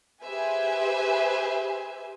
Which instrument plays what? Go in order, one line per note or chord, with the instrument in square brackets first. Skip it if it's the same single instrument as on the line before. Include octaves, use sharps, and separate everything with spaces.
[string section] G4 G#4 B4 C5 E5 G#5